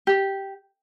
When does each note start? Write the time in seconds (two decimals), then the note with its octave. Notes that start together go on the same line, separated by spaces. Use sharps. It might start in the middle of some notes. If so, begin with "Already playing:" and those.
0.07 G4